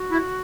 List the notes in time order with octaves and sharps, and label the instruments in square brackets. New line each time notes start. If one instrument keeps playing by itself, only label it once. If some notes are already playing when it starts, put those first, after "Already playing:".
Already playing: [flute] F#4
[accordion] E4